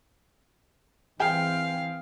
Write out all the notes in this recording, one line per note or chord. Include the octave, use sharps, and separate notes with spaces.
E3 C4 G#4 F5 G5